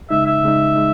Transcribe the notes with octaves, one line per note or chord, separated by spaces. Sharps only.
C#3 G#3 D#4 E5
E5
C#3 G#3 D#4
G#3 D#4